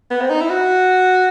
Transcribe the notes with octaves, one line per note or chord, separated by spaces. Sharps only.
B3
C4
D#4
E4
F#4